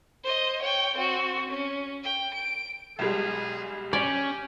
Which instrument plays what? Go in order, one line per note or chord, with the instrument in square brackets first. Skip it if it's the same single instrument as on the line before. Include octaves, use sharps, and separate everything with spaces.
[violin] C5 D#5
C#5 G5
C4 F#4
C#4
G5
D7
[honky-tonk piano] B1 G3 G#3 [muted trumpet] G#4
[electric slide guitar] C#4 [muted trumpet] G4 [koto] D5